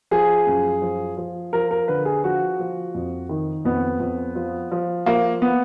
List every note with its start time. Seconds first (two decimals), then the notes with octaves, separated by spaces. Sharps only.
0.11 F3 G#4
0.47 F#2
0.82 F3
1.17 F3
1.53 F3 A#4
1.71 A#4
1.88 D3 B4
2.05 G#4
2.24 F3 F#4
2.59 F3
2.94 F2
3.29 D#3
3.65 F2 B3
4.00 F2
4.35 F3
4.72 F3
5.06 F3 A#3
5.42 B3